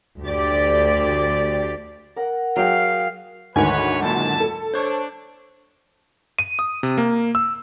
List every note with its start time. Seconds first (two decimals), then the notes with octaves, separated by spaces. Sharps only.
0.22 D2 G4 D5
2.16 A#4 F#5
2.56 F#3 G#4 F5 G5
3.56 D2 G#2 D#3 B4 C#5 G#5
4.02 F#2 A#2 E4 A5
4.40 A4
4.74 D4 C5 C#5
6.39 D#7
6.59 D#6
6.83 C3
6.98 A#3
7.35 E6